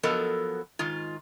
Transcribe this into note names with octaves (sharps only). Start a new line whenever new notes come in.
F3 F#3 B3 A4 A#4 D#5
G#2 D#3 F4